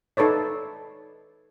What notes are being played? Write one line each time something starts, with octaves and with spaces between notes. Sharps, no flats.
D#4 A4 B4 C#5 D5